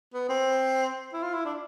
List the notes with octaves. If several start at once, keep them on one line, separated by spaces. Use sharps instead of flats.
B3
C4
E4
F4
E4
D4